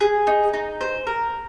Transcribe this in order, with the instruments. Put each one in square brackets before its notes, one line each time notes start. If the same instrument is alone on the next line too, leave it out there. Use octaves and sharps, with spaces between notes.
[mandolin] G#4
D#4
D#4
C5
A#4